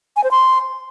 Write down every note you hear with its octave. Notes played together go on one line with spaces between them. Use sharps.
G#5
C5
C6